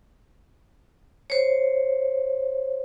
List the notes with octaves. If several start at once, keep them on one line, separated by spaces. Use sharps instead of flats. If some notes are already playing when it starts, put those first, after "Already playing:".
C5 C#5